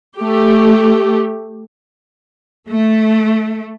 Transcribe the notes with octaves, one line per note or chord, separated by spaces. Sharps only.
A3 G4
A3